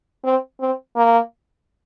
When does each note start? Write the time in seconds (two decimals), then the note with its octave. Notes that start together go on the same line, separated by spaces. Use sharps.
0.24 C4
0.61 C4
0.96 A#3